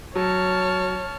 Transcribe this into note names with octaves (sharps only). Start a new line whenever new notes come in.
F#3 C#5 A5 F6